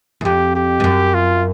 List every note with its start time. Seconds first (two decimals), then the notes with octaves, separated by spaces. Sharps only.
0.21 E2
0.25 F2 G4
0.55 G4
0.80 G2
0.84 F#2
1.14 F4